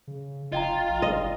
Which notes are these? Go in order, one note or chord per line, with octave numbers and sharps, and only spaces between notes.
C#3
F1 F4 D#5 G5 A#5
A#1
G1 D#5